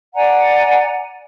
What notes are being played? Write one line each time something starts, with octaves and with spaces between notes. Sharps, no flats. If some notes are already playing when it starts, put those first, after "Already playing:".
D5 F#5 G#5 A#5